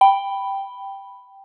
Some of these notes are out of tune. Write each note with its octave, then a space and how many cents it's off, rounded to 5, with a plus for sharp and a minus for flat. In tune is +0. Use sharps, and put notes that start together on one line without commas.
G5 +0 B5 +0